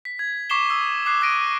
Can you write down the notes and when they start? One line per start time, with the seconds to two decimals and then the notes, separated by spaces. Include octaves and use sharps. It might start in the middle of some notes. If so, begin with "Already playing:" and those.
0.05 B6
0.19 G#6
0.50 C#6 D6 B6 C7 E7 G7
0.69 D#6 E6 B6 C7
1.06 D6 F#6 C7
1.21 D6 F#6 G#6 A#6 D7 D#7